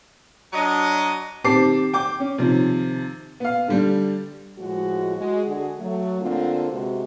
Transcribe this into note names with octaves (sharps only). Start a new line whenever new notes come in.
F#3 D4 D#5
D#3 C4 G4 A5 D6 C7
G5 D6
C#4
C3 D#3 F3
B3 F5
D3 G3 D4
A2 F3 G#3 F#4
G#3 F#4
D3 F#4 G#4
F#3 A3
D3 A#3 C4 F4
C3 G#3 B3 F#4